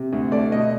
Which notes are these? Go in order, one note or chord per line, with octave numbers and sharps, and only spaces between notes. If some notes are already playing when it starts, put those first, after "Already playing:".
Already playing: C3
D2
A3 D5
B2 D#5